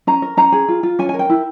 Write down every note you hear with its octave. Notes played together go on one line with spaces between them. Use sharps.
C#4 A#5
A#4
C#4 A#5
G#4
F4
F4
C#4 G#5
A#4 G#5
G5
E4